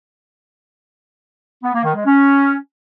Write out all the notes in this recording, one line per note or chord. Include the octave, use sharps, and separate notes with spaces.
B3
A#3
D#3
G#3
C#4